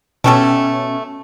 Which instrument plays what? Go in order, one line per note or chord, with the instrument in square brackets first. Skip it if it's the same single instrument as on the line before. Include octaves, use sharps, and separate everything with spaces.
[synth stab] B2 C#4 [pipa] A3 G4 A4